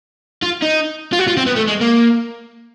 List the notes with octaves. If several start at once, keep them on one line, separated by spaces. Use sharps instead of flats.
F4
D#4
F4
F#4
F4
C4
B3
A3
G#3
A#3